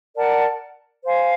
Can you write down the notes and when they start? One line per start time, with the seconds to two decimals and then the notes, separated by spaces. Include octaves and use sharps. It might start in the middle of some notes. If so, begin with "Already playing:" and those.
0.16 A#4 D5 F#5 A5
1.04 C5 F5 G#5